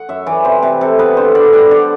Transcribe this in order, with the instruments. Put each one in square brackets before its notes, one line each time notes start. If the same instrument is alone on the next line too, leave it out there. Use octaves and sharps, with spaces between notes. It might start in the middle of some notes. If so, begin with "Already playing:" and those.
Already playing: [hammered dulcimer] F#5
F#2 E5
E3 D5
C3 C5
C3 B4
C3 A4
B3 B4
D3 C5
D3 D5
G3 F#5
D3 D5